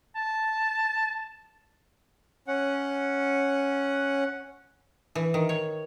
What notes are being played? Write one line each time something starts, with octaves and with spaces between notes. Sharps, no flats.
A5
C#4 F#5
E3
D#3
C#5